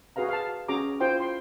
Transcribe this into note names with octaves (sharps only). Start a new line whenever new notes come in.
F#4 G#4 B4 F5 A#5
F5 A5
C#4 F#4 G#4 A#5 D6
E4 F4 C5 G5 C6
C6